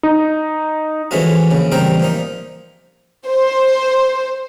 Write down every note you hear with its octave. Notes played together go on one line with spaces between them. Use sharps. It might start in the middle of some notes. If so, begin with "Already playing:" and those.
D#4
E3 F3 G#3 A3 C#4 F#4
A#1 C#3
A1 G3 C4 D#4 A#4 G5
A#2 F3 D#4
C5